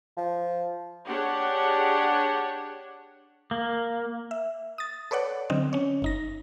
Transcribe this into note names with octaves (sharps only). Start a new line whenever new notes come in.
F3
D4 G4 G#4 C#5 F#5
A#3
E5
D#6 A6
A4 B4 C#5 D5 F#5
D3 F#3 C4 D#5
C#4 C#5
G1 D#4 A#6